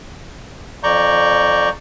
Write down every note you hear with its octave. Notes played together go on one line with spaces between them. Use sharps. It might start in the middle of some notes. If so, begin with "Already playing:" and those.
F2 D5 A#5 C#6 G6